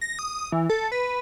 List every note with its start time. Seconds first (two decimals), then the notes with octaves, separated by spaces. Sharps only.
0.01 A#6
0.19 D#6
0.52 E3
0.69 A4
0.91 B4